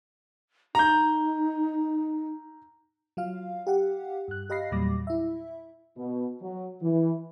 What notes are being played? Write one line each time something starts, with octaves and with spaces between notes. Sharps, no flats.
D#4 A#5 G6
F#3 F4 F5
G4 F5 F#5
G2 F#6
G4 D#5 F5 B5 A#6 C7
E2 A#2 F#3 G3 D6 A#6
E4 E5
B2
F#3
E3